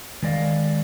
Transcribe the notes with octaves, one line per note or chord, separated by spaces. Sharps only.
D#3 G#3 D5 D#5 F5